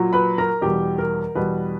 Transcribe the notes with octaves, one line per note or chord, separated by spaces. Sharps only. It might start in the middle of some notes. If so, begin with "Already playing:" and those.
Already playing: A#2 F#3
B4 B5
A#4 A#5
E2 B2 G3 G4 G5
A#4
E2 B2 G3 B4